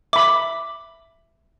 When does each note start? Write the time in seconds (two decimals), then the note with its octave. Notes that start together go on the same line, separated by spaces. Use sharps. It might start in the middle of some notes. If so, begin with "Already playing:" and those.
0.13 E5 B5 D6